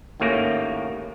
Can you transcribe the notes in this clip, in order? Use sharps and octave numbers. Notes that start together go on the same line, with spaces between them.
G#1 D#2 A2 A#3 C#4 A#5